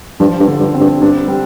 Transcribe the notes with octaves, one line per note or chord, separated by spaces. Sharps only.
G2 F3
G2
D3
G2
C4
G2
G2 D4
G3